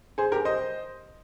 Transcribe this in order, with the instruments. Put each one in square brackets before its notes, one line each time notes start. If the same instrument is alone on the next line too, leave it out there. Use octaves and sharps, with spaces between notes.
[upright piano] G#4 C5
G4 A#4
C5 D#5